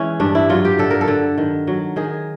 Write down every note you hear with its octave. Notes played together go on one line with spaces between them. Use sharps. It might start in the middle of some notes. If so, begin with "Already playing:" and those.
Already playing: E3 G#3 C#4
G2 D4
E4
F#3 F4
G4
D3 A4
A#4
A4
D3
D#3
F#3
D#3 G#4